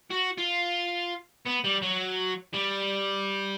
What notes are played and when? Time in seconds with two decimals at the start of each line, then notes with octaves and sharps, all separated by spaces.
0.11 F#4
0.38 F4
1.46 B3
1.64 G3
1.82 F#3
2.54 G3